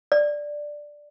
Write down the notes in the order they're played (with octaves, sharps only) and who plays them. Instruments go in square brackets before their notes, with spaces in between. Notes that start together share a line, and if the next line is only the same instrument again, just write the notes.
[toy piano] D5